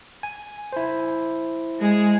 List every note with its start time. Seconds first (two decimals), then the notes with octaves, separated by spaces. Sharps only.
0.23 G#5
0.73 E4 C5
1.79 G#3 G#4